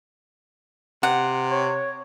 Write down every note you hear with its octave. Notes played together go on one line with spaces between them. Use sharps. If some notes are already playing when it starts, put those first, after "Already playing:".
C3 F#5
C#5